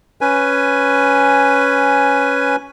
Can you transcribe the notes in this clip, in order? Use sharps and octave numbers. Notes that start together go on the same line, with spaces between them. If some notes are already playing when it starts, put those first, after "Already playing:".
C#4 B4 G#5